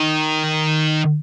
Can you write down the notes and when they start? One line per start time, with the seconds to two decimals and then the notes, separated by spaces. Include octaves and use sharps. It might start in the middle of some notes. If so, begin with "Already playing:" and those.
Already playing: D#3